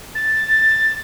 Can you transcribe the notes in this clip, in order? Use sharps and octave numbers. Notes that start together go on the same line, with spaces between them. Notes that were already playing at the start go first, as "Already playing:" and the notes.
A6